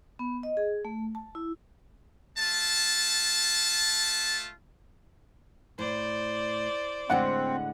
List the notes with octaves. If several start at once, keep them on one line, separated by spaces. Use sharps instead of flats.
B3
D#5
G#4
A3
A5
E4
A3 F4 A5
A2 C5 D5
A2 D3 G#3 C4 F#5